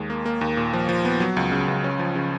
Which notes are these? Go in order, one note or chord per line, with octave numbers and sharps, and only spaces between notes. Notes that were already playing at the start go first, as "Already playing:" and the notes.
Already playing: D#2 G#3
A#3
A#3
D#2
A#2
F3
F3
B3
F#3
C#2
C#3
C#2
C#4
F3
C#3